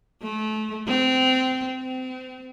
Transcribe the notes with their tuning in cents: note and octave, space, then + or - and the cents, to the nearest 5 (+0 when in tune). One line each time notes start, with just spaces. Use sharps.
A3 -30
C4 -20
C4 -30